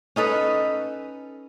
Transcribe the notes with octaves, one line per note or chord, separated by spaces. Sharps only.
C#4 D#4 A4 B4